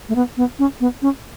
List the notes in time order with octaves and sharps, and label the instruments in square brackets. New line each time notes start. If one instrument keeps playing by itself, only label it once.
[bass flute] A3
B3
B3
C#4
B3
C#4